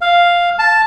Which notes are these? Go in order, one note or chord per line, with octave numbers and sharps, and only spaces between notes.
F5
A5